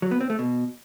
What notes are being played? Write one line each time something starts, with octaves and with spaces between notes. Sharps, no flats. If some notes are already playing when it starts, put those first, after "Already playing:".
F#3
B3
C4
A3
B2